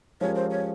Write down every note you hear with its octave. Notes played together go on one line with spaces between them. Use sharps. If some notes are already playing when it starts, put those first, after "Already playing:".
F3 G#3 C#4 G4 A#4 C#5
C5
C#5